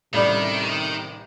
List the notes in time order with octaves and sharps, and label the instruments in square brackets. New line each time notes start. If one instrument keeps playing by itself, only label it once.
[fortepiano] A1 G3 D5 [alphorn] C3 [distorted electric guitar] D#3